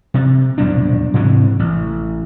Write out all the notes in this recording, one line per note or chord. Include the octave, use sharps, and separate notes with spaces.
C3
D#1 B1 G#2 D4
G#2 C3 E3 G#3
A1